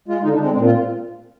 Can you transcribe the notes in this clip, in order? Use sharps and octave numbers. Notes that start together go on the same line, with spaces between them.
G#3 F4
D3 D#4
D4
G#3 C4
A#2 C4
F4